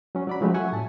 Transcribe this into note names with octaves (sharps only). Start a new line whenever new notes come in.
F#3 C#4
F#3 D5 B5
F3 F#3 G#3 A3 C#4 G4
E5 F#5 G#5 C#6
A2 G#5 A5